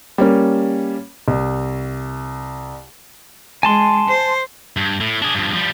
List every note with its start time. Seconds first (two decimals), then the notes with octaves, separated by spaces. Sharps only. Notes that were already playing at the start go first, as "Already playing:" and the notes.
0.18 G3 A#3 C#4
1.28 C2
3.63 G#3 G#5 A5 C6
4.08 C5
4.77 G2
5.00 A2
5.22 D4 G#4
5.35 G2 F3
5.54 F3 G3